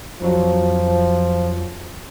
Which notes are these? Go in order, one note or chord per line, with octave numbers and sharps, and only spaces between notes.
F2 F3 F#3